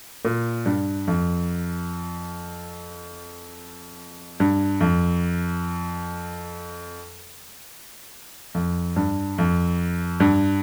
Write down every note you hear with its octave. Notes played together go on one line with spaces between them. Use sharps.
A#2
G2
F2
G2
F2
F2
G2
F2
G2